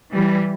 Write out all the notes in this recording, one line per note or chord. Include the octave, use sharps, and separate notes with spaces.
E3 G3